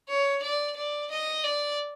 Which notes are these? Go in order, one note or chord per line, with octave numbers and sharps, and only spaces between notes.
C#5
D5
D5
D#5
D5